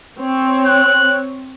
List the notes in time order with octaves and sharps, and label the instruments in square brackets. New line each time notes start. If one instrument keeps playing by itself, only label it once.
[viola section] C4 C#5
[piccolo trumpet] F#6